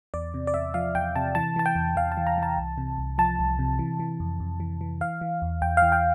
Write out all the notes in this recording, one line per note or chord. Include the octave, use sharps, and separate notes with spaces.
E2 D5
C3
D5
E2 E5
F3 F5
E2 G5
C3 A5
E3 A5
E3 A5
G5
E2
E2 F5
A5
E3
A#5
E3 A5
C2
C3
C2
F3 A5
C2
C3
E3
E3
F2
F2
E3
E3
E3 F5
E3
E2
E2 G5
E3 F5
G5